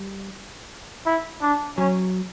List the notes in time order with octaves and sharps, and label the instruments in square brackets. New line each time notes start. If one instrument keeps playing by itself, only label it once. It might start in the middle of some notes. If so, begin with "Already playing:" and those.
Already playing: [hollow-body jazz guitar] G3
[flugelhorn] E4
D4
[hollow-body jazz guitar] F#3 [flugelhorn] C#4